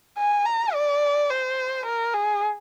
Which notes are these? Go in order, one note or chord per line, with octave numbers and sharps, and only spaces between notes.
G#5
A#5
D5
C5
A#4
G#4